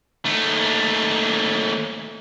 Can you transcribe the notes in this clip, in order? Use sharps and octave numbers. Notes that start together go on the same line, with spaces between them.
D#2 A3